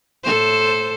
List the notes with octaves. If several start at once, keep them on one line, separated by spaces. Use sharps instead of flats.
A2 A4 C5